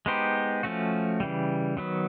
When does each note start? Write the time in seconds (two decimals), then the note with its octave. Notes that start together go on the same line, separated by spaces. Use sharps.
0.06 G#3 B3 D#4 G4 C5
0.63 F3 A3 C#4 F#4
1.20 C#3 E3 G3
1.77 D#3 F#3 B3